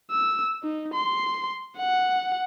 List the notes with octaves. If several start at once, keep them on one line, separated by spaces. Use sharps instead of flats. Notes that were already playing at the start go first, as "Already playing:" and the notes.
E6
D#4
C6
F#5